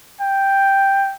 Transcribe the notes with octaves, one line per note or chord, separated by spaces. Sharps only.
G5